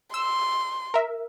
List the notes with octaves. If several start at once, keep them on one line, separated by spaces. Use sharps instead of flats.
C6 E6
A#4 E5